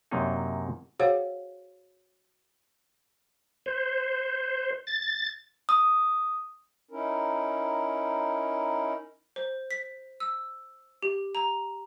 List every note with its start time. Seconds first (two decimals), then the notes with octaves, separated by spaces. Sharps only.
0.11 F#2 C3 F#3 A#3 D4 D#4
1.00 F#4 G#4 C5 C#5 F5 F#5
3.66 C5
4.87 A6
5.69 D#6
6.91 C#4 D#4 E4 A#4
9.36 C5
9.71 B6
10.20 E6
11.03 G4
11.35 A#5